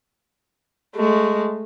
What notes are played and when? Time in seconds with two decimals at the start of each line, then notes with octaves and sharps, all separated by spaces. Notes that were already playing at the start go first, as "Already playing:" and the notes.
0.96 G#3 A3